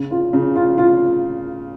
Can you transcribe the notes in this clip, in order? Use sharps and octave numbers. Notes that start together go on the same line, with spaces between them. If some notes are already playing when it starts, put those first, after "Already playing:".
Already playing: C#3
F4
C#3
F4
F4